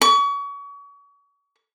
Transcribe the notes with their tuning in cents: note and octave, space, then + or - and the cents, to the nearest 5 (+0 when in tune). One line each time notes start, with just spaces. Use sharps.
C#6 +35